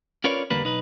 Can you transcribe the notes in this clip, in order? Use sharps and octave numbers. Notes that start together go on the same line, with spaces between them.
C#4 F4 A#4 B4 C#5 D5
E2 D3 G3 A#3 B4
B1 D#4 B4